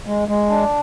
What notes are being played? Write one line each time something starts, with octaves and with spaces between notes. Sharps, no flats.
G#3
G#3
D4